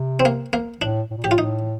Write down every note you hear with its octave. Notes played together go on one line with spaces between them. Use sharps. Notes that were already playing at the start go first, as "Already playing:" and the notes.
Already playing: C3
C4
A#3
A#3
A2 D4
A2
A#2
A2 G4
F4
A2 D#4